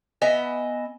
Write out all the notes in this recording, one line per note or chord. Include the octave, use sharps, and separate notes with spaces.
B3 D#5 E5 G#5